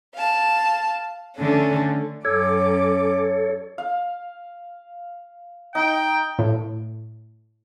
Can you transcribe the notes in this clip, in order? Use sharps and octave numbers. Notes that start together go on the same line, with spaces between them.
F5 A5
D3 A3 C#4 D4
F#2 C#4 A4 C#5 D6
F5
D#4 G5
A2